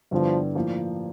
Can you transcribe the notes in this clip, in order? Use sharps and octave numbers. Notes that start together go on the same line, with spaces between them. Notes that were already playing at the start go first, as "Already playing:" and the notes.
G2 D3 F3 G3 B3 E4
A2 F3 A#3